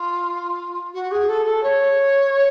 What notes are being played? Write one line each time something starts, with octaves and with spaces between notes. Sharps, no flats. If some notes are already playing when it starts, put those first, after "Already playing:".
Already playing: F4
F#4
G#4
A4
A4
C#5